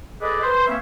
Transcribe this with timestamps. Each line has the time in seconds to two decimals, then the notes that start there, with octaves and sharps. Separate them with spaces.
0.21 G#4 A4 B4 D5 D#5
0.42 B4 C5
0.67 A#3 C4 C#4 E5